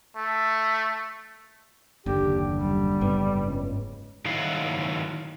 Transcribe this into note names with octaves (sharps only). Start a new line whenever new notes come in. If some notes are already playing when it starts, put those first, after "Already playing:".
A3
F#1 D#2 D3 G4
G3
F#1 G#2 B3
C#2
D#3 F#3 E4 F5 F#5